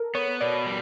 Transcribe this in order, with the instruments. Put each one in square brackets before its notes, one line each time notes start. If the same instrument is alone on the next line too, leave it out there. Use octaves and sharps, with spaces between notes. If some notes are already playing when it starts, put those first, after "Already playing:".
Already playing: [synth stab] A4 A#4
[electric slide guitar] B3 [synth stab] C#5
[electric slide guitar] B2 [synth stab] D5
[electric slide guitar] G3